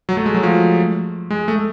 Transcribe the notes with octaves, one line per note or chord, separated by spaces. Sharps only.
F#3
A3
G#3
F#3
F3
G#3
A3